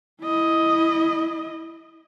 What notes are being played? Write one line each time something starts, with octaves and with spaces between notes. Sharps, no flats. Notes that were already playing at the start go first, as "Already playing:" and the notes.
E4 D#5